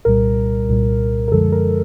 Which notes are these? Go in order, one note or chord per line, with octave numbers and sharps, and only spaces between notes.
C2 A#2 G3 A#4
C2 A#2 G3
A#4
F#2 D3 F3 G#3 A4
A#4